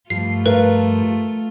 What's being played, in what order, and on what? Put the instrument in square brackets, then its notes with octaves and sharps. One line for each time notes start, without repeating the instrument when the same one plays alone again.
[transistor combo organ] G2 F3 [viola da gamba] A3 F4 [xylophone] C7
[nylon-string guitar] A#4 F5 [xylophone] B4